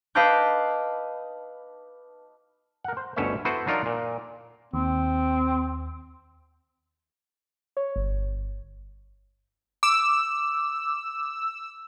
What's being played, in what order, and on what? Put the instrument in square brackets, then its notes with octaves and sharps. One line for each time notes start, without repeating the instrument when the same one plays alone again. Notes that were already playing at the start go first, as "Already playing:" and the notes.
[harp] B4 D#5 F5 A5 D6 G6
[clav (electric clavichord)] A#4 F#5
C5
G1 D2 B2 C#4 C#5 E5
B3 E4 F#4 A4 B4 C5
F#3 D4 D#4 F4 A#4 D5
A#2
[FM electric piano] D#2 [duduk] C4
[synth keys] C#5
G1
[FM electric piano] D6 [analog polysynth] E6